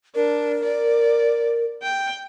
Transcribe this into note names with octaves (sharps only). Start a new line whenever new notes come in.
D4 A#4
D5
G5